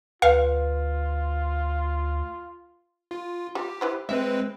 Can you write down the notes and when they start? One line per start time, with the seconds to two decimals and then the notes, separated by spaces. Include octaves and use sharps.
0.22 D2 F4 B4 F5
3.11 F4
3.55 F4 G4
3.81 E4 B4 C5
4.09 G#3 C4 B4 E5